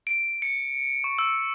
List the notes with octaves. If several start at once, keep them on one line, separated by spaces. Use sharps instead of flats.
D7
C#7
C#6
E6